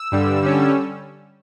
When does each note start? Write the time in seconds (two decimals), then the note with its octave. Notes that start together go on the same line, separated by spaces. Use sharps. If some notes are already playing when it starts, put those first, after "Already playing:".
Already playing: E6
0.12 G2 D3 G3
0.42 D3 G3 C#4